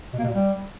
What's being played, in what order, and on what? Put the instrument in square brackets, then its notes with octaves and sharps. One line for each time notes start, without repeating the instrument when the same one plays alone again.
[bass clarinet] B2
A#3
B2
A#2
G3